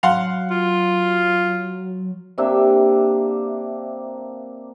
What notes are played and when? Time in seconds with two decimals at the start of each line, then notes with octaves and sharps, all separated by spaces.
0.03 F#3 F5 F#5 C6
0.51 F4
2.38 C3 A#3 D4 E5